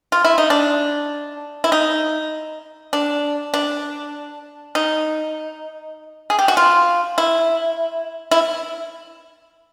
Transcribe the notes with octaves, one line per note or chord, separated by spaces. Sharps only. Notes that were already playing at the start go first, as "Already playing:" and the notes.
F4
E4
D#4
D4
E4
D#4
D4
D4
D#4
G#4
G4
F#4
F4
E4
E4